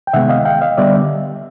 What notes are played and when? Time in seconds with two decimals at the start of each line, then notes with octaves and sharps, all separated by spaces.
0.07 G5
0.13 C3 D#3 G#3 B3 E5 F#5
0.29 D#5 F5
0.45 F5 G5
0.61 D#5 F5
0.78 D3 G3 B3 D5 E5